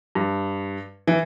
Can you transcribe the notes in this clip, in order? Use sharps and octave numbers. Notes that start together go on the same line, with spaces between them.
G2
E3